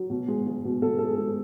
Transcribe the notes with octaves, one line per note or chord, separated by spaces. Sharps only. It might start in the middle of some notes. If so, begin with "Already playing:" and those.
Already playing: F#3
B2
G#3
G#3
B2
B2 A4
G#3 A4
G#4
G#3